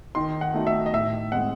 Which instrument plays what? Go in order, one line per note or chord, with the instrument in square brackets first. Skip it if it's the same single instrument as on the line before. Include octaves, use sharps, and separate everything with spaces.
[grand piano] D#3 [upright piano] C6
[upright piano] F#5
[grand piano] A3 D#4 F#4
[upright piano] E5
D#5
[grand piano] A2 [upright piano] E5
[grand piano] G#3 C4 [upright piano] F#5